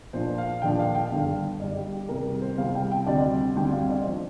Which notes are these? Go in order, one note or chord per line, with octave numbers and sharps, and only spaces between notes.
A#2 F3 D4 C5
F5
A#2 F3 D4 G5
F5
G5
G2 D3 G3 F5
G2 D3 G3 D5
G4
G4
C2 C3 G3 A#4
G4
C5
C2 C3 G3 F5
G5
G5
D2 C3 G3 C4 D5
D2 C3 G3 C4 G5
F5
D5
F3 D4 C5